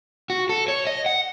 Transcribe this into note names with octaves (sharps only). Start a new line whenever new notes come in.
F#4
A4
C#5
D#5
F#5